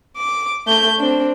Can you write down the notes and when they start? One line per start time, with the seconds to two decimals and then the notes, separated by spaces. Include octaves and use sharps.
0.18 D6
0.67 A3 G6
0.99 C4 D4